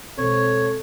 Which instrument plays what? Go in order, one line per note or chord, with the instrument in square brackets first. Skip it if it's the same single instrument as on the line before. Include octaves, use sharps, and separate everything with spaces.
[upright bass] B2 G#3 [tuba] C4 [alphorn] A4 [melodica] C#5